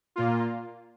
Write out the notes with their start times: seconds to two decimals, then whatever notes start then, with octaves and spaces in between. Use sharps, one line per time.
0.16 A#2 A#3 F4